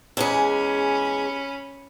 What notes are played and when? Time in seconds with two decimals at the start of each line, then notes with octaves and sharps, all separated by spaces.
0.17 E2 G#3 C#4 G#4 B5